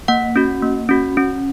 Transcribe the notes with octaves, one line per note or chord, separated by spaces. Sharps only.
A#3 F#5
C#4 F#4
A#3
C#4 F#4
C#4